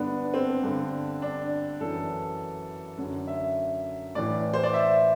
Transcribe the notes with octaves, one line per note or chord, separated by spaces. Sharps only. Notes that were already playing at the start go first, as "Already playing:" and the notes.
Already playing: G2 D3 B3 D4
C4
G2 D3
D4
F#2 E3 A4
F#2 D3
E5
A2 E3 D5
C5
D5
E5